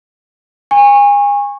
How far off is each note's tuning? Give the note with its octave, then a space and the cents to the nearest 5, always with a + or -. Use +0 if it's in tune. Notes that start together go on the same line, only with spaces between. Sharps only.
G#5 -30 C#6 -20